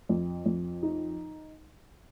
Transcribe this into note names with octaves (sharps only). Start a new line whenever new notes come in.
F2
F2
D#4